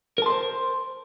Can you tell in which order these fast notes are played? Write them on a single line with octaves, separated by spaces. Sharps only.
A#4 A5 C6 C5